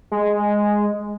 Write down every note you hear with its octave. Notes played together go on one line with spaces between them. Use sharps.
G#3